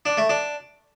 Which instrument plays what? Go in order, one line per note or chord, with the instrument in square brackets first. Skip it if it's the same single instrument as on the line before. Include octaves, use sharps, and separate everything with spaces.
[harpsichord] D4
A3
D4